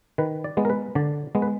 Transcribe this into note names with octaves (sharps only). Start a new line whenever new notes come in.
D#3 B4
D5
G#3 B3
A#4
B4
D3 D5
G#3 B3
B4